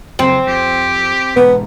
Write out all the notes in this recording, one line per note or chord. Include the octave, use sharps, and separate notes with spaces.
F#1 F2 C#3 C4
F2 G4
E1 G#2 B3